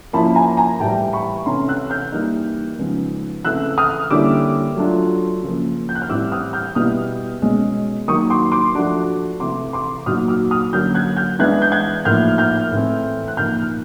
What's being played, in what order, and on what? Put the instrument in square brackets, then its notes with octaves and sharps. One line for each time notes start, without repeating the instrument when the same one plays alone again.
[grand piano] F3 A#3 C#4 E4 [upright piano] A5 B5
[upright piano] B5
G#5 A#5
G#5 A#5
[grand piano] A2 E3 G3 [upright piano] G5 A5
[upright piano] B5 C#6
[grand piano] C3 E3 A3 C#4 [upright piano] A#5 C6
[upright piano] E6 F#6
F6 G6
[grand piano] E3 G3 A#3 D#4
C#3 F3 G#3 B3 D#4
[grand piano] C#3 E3 A3 C4 [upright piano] E6 F#6
[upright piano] D#6 F6
[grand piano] D3 G3 A#3 C#4 E4 [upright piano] D6 E6
[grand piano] F#3 A3 D4 F4
C#3 F3 A#3
[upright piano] G6
F#6
F6
[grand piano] A2 E3 G3 C4 E4 [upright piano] D6 E6
[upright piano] D#6 F6
F6 G6
[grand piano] B2 G3 B3 E4 [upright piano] D#6 F6
[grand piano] B2 G#3 C#4
[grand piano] D#3 F#3 A#3 [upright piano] C#6 D#6
[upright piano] C6 D6
C6 D6
[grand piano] F3 A3 D4 F#4
[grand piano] C3 E3 A3 [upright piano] C6 D6
[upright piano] C6 D6
[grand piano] A#2 F#3 B3 D#4 F#4 [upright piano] D#6 F6
[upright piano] D6 E6
D#6 F6
[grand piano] D3 F#3 A#3 C#4 F#4 [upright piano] F6 G6
[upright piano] F#6 G#6
F6 G6
[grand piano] E3 G#3 B3 D4 [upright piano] F#6 G#6
[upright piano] G6
F#6 G#6
[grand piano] A2 F3 A#3 D#4 [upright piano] F6 G6
[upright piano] F6 G6
[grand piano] A2 E3 A3 C4
[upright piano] F#6
[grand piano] A#2 F3 A#3 D#4 [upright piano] F6 G6